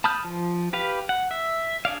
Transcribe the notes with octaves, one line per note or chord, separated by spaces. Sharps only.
A5 B5 D#6 F6 G6
F3
G4 B4 F5
F#5
E5
D4 G#4 D5 F5